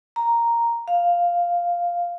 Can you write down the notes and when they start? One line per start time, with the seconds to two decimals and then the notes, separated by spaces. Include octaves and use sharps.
0.16 A#5
0.88 F5